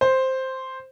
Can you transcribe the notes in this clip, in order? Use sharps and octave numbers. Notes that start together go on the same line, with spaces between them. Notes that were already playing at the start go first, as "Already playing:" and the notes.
C5